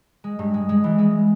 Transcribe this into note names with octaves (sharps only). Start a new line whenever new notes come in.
G#3
G2
G#3
G#3
E3
G#3